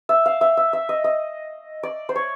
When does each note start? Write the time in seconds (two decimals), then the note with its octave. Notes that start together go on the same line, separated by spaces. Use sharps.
0.09 E5
0.26 F5
0.41 E5
0.57 E5
0.73 E5
0.89 D#5
1.04 D#5
1.83 D5
2.09 C5
2.16 C#5